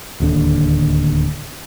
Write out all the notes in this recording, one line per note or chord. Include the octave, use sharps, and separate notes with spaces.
D1 D#2 D3